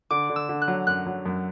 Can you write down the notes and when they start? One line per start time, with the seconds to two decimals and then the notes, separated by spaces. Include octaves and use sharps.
0.11 D3 D6
0.30 D3
0.36 E6
0.49 D3
0.62 F#6
0.68 F#3
0.87 F#2 F#6
1.06 F#3
1.26 F#2